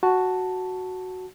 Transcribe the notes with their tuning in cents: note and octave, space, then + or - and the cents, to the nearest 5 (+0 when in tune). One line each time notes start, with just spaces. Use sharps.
F#4 +0 A5 +0